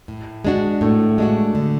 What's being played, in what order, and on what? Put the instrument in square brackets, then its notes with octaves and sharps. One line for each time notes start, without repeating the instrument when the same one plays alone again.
[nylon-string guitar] A2
G#3 D4 F#4
[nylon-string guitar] A2 [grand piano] A3
[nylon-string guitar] G#3 D4 F#4
D3